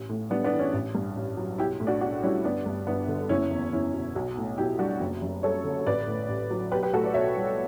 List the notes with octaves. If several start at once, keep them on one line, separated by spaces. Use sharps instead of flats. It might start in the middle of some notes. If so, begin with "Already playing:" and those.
Already playing: A1
A2
G3 B3 D4
B3 D4
E3
C#4 E4
A1
G2
A1
F#3
B1 E4 G4
A2
D4 F#4
B1 D4 F#4
G3 C#4 E4
G1 B3 D4
G2
G1 B3 D4
D3
F#1 C#4 E4
E2
F#1 C#4 E4
B2
B1
A2
B1 E4 G4
G3 D4 F#4
F#1
F#2
G3 A4 C#5
D3
A1 B4 D5
A2
A1
F#3
B1 G4 B4
G4 B4
A2 F#4 A4
B4 D5
B1 C#5 E5
G3